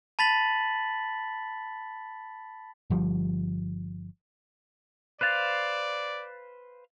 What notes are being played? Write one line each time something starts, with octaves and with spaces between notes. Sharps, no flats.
A5 B5 A6 B6 F#7
G1 F3 G3
B4 C5 D5 F5 F#6 A6